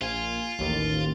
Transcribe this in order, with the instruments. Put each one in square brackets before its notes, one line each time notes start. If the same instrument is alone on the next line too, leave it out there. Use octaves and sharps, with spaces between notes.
[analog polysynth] A#1 G#5 [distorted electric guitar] F4
[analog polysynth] A1 D#2 A6